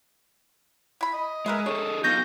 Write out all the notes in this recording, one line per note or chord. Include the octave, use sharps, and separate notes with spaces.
E4 B5
D#5
G#3 A#4 B4 E5
D4 G#4 A4 C#5
F#3 B3 D#4 F4 C#6 G6 A#6